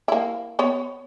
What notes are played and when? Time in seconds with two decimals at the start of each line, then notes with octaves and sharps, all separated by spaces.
0.08 A#3 E4
0.59 B3 C#5